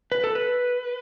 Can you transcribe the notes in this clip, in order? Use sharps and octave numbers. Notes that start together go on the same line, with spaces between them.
B4
A4
B4